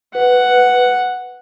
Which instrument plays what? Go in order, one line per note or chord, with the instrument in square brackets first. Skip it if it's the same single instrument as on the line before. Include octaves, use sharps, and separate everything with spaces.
[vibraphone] B4 [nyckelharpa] F#5